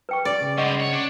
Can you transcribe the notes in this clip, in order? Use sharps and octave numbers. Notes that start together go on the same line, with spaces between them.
B4 G5 C#6
D5
C#3
G2 G#3 D#5 F#5 C#6
C#5
D4